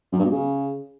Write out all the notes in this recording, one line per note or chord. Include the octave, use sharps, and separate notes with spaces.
F#2
G2
B2
C#3